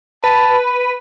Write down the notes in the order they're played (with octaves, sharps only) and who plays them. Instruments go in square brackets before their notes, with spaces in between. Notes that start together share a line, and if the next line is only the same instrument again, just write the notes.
[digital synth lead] B4 [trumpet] A5